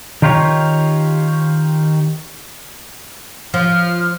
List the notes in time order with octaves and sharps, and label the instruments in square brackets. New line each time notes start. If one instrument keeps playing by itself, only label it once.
[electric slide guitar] D#3 D#4 F4 G4 C#5
[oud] F3 [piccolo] F6